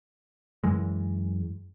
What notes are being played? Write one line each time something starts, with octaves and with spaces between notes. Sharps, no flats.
F#2 E3 G#3